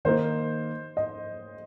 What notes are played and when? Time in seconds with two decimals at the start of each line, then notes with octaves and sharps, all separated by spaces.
0.05 D#3 A#3 D#4 C5
0.97 D#5